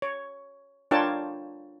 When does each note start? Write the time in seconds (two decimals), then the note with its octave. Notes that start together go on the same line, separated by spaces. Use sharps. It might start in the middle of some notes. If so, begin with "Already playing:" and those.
0.02 C#5
0.91 D4 F4 A#4 C#5 G5 A5